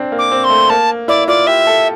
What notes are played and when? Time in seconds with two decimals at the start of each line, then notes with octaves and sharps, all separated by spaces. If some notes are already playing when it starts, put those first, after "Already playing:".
Already playing: C4 D4
0.12 A#3
0.19 D6
0.32 C4
0.44 C6
0.50 A3
0.70 A#3 A5
1.08 E4 D5
1.28 F4 D5
1.47 G4 E5
1.67 A4